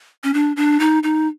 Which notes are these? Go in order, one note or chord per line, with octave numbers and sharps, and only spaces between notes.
C#4
D4
D4
D#4
D#4